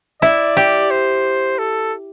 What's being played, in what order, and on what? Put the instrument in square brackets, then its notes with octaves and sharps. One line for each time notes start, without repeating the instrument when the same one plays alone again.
[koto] E4 [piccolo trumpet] D5
[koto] G4
[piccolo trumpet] C5
A4